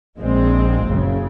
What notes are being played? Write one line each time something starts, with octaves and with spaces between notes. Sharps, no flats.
A#1 A#2 G#3 C4
F#1 F#2 C#3